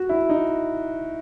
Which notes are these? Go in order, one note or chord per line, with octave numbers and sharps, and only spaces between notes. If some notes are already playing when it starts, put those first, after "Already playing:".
Already playing: F#4
E4
D#4